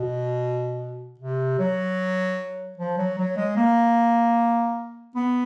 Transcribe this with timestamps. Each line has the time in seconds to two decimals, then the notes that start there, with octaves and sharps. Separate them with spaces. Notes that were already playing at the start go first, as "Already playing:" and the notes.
Already playing: B2
1.19 C3
1.59 F#3
2.78 F3
2.98 F#3
3.18 F#3
3.36 G#3
3.56 A#3
5.15 B3